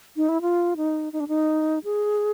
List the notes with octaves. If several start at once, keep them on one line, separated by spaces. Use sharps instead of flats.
D#4
E4
F4
D#4
D#4
D4
D#4
G#4